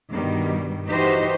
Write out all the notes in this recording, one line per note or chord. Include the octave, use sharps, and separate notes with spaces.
G2 B2 D#3 G3
E3 D#4 F#4 G4 C5 D#5